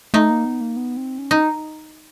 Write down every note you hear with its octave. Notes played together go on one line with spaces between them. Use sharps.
A3 D#4
A#3
B3
A#3
B3
C4
C#4
D#4